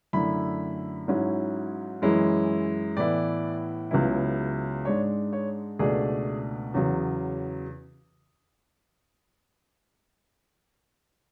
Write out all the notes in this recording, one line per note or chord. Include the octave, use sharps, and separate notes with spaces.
F#2 D3 A3 E4 B5
G#2 F#3 C#4 E4
F#2 E3 G#3 C#4 E4
A2 E3 B3 E4 D5
C#2 C#3 F#3 B3 E4
G#2 G#3 D4 C#5
C#5
C#2 B2 A3 D4 G#4
E2 C#3 F#3